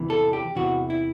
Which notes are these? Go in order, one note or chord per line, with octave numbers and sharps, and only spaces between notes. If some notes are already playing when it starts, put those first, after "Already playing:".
Already playing: E2 C3 E3
A4
G4
E2 C3 E3 F#4
E4